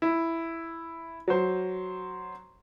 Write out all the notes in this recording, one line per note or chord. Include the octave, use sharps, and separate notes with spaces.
E4
F#3 C5